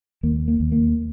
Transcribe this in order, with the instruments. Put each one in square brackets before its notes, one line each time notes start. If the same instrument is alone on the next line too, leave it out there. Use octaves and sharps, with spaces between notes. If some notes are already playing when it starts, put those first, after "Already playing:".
[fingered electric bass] D#2 A#3
A#3
D#2
A#3